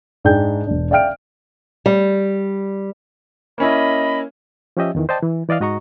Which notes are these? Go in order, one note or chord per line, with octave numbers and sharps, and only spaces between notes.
G#2 D4 G#4 G5 G6
E1 D4
D5 E5 F5 G5 F6 D7
G3
A#3 C#4 E4 D#5 B5
F3 C#4 G4 D#5 E5
E2 D#3 E3
C5 D5 D#5 G5 A5
E3
E3 D5 D#5 F5 F6
G#2 F#4 D#5 A#5 C#6